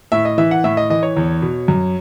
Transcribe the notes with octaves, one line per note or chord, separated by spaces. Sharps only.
A2 E5
D#5
E3 E5
F#5
A2 E5
D#5
E3 D#5
C#5
E2
B2
F#2